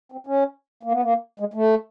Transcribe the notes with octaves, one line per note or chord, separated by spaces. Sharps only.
C4
C#4
A#3
B3
A#3
G#3
A3